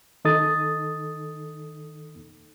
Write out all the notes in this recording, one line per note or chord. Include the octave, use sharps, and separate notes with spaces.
D#3 D#4 A4 D#6 A6